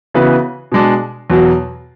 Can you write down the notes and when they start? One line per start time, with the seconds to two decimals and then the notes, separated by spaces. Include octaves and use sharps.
0.14 C#3 E3 B3 F#4 B4
0.72 B2 G#3 D4
1.30 E2 B2 F#3